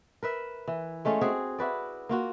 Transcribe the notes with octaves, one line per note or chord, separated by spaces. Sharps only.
A#4 B4 E5
E3
G#3 A3 C#4 F4
C4 F#4 G#4
E4 F#4 B4 D5
A#3 F4 F#4